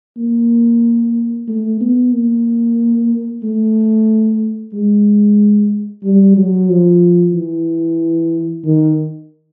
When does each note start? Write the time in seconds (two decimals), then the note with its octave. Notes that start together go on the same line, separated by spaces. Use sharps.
0.18 A#3
1.48 A3
1.81 B3
2.13 A#3
3.43 A3
4.73 G#3
6.04 G3
6.37 F#3
6.69 F3
7.34 E3
8.64 D#3